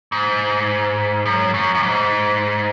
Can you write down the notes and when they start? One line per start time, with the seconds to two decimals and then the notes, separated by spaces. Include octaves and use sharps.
0.12 G#2
1.26 F#2
1.54 F#2
1.75 F#2
1.83 G#2